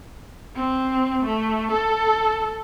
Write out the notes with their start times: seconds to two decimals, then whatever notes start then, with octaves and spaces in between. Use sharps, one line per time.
0.55 C4
1.25 A3
1.72 A4